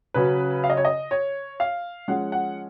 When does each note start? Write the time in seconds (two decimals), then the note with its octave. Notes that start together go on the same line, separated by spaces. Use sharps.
0.14 C#3 F#3 C#4 B4
0.64 F5
0.70 D#5
0.77 C#5
0.85 D#5
1.11 C#5
1.60 F5
2.08 F3 G#3 C#4 F#5
2.32 F#5